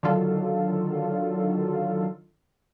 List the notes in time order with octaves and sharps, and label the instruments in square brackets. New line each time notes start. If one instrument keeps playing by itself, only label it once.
[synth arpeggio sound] D3 D#3 F#3 F4 A4